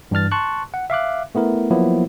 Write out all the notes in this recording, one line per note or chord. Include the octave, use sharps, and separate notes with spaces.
G2 E3 D4 F6 A6
A5 C6 C#6 F#6
F#5
E5 F5 D6 F#6
A3 B3 E4 A#4
F3 F#3 A#3 B3 E4